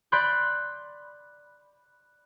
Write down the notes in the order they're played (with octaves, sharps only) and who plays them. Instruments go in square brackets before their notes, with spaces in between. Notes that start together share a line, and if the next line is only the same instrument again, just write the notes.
[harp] D5 B5 C6 F#6 G6